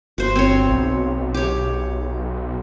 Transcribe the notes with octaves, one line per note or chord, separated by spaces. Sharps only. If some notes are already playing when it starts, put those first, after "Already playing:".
G1 F#4 C5
C4 C#5
B1
G4 C#5